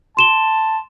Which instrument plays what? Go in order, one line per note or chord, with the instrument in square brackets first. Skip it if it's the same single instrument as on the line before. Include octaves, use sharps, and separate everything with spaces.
[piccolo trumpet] A5 [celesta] C6 E7 G7